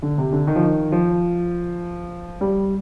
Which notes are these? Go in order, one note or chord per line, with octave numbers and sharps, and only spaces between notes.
D3
C3
D3
D#3
F3
D#3
F3
G3